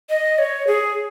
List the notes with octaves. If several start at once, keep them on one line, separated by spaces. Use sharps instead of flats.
D#5
C#5
G#4